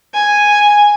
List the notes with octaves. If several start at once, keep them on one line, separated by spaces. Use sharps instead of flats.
G#5